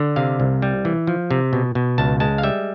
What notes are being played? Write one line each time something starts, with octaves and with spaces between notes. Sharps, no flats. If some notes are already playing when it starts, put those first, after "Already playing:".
Already playing: D3
C3 F5
C2
G3
E3
F3
C3
B2
B2
C#2 A5
G#3 A5
F5
G3 E5